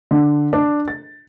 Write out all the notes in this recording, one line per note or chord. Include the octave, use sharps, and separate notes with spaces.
D3
D4
A6